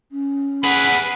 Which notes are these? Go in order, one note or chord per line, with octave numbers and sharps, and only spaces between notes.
C#4
G#4 B4 F#5 B5